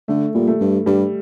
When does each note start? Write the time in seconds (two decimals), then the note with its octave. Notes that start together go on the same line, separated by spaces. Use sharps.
0.08 D3 A3
0.34 A#2 G3
0.47 A3
0.61 G2
0.86 G2 G3